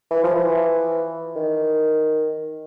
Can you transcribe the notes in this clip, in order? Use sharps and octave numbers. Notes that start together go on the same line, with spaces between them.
E3
F3
E3
D#3